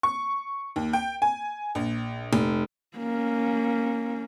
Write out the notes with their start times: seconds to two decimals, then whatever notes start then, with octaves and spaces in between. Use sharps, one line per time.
0.03 C#6
0.76 D#2
0.93 G5
1.22 G#5
1.75 A#1
2.33 F1
2.97 A#3 C#4